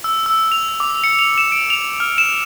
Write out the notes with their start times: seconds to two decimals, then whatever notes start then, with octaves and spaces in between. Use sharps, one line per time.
0.04 E6
0.26 E6
0.52 F7
0.80 D6
1.04 C#7
1.19 F7
1.38 E7
1.52 D7
1.70 F7
2.00 F6
2.18 E7